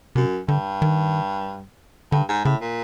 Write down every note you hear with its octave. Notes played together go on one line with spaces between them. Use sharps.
F#2 C3
G2 D3
D#3
G2 D3
G#2
A2 C#3
A#2